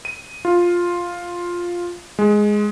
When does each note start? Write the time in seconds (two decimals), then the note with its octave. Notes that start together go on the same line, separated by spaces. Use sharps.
0.05 D#7
0.45 F4
2.19 G#3